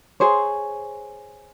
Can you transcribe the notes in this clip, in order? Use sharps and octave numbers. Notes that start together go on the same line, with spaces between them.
G#4 C5 C#5